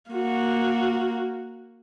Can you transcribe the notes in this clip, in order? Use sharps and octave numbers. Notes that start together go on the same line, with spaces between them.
A#3 F#4